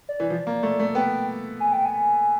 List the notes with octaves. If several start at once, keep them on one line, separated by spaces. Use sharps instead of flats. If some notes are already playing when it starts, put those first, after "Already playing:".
D5
E3
F3
A#3
A3
A3
B3 G5
G#5
G5
G#5